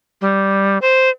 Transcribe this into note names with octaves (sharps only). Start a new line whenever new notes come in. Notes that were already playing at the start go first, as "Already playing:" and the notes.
G3
C5